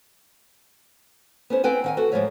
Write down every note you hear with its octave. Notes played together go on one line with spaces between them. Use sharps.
B3 C#4 C5
C4 B4 G5 G#5
D#3 F#5 G#5
F#4 A4 B4
G#2 B2 F3 C#5 E5